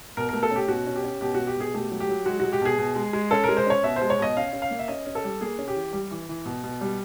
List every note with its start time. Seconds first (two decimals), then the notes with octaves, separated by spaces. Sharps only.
0.17 B2 A#4
0.29 A3 A#4
0.43 A4
0.51 C#4 G4
0.68 B2 F#4
0.87 C#4
0.96 G4
1.04 C#4
1.21 B2 G4
1.34 B2 F#4
1.47 G4
1.57 B2 G#4
1.74 A3 G4
1.91 F#3
2.00 G4
2.09 F#3
2.26 G#3 F#4
2.40 G#3 F#4
2.53 G4
2.61 B2 G#4
2.78 B2
2.96 G#3
3.13 G#3
3.31 C#4 A4
3.44 G#3 A#4
3.57 C5
3.67 C#4 C#5
3.83 B2 E5
3.96 C5
4.01 G#3
4.10 C#5
4.18 B2 D#5
4.37 C#4 F5
4.53 C#4
4.62 F5
4.71 A#3
4.79 E5
4.88 C#4 D#5
5.07 C#4
5.15 A4
5.24 G3
5.41 A#3 G#4
5.58 C#4
5.68 G4
5.75 E3
5.93 G3
6.11 E3
6.29 E3
6.46 B2
6.63 B2
6.81 G3